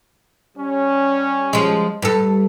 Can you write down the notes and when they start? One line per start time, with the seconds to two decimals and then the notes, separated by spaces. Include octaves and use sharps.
0.56 G3 C#4
1.53 F3 G#3
2.02 G2 A4